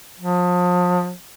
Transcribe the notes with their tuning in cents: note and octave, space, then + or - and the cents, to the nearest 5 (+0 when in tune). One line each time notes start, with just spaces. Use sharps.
F3 +35